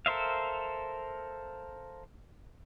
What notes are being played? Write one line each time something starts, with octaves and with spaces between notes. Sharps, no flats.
A4 A#4 C5 E5 F5